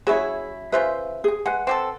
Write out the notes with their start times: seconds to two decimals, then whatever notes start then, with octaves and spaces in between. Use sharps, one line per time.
0.07 F#3 C#4 E4 G#4 C#5
0.72 C#3 F4 B4 C5 E5
1.24 G#4 G#5
1.46 G#3 B4 F#5
1.67 C4 G4 A4